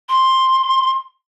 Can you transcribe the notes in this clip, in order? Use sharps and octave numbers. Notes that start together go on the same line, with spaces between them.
C6